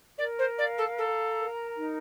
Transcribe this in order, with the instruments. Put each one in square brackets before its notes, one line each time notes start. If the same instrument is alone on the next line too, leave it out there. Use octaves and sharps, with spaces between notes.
[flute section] A#4 [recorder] D5
[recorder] C5
[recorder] D5 [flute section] F5
[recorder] A4
[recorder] A4 [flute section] A#5
[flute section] A#4
D#4